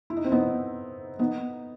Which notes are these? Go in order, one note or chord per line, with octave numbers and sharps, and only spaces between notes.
E4
D#4
C4
B3 D#4
B3 D#4